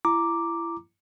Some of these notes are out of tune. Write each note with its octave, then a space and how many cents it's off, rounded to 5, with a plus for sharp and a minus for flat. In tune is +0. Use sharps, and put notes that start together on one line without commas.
E4 +30 A#5 +0 D6 +0